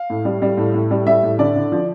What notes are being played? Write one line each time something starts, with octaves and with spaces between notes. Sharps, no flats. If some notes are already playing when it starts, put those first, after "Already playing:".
Already playing: F5
A2
G3
G3
A2
A2
G3
G3 E5
A2
D3 D5
D3
F3